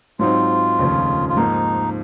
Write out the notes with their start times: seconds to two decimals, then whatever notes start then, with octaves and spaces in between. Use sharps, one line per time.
0.19 G#2 F#3 C4 D#4 F4
0.79 F1 D#2 C#3 F3
1.29 F4
1.37 G#2 F3 A#3 D#4